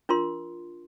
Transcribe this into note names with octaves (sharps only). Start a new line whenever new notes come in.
D4 F4 A#4 C6